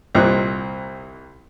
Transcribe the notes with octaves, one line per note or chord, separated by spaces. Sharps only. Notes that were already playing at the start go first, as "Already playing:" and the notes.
C2 A#2 C4 D#5 F#6